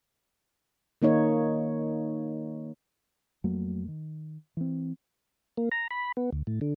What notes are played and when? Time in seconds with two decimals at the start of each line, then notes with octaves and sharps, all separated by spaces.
1.02 D#3 A#3 D#4 C#5
3.44 F2 F#3 A3 A#3
3.88 D#3
4.57 E3 C4
5.57 A#3
5.72 A#5
5.91 B5
6.17 B3
6.32 D2
6.47 A2
6.61 D3